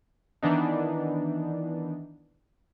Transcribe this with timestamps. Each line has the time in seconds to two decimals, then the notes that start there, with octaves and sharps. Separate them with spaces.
0.43 D#3 E3 B3 D4 D#4